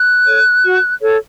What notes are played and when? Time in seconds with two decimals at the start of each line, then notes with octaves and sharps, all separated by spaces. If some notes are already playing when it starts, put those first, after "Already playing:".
Already playing: F#6
0.27 A4 C#5
0.64 F#4
1.02 A4 C#5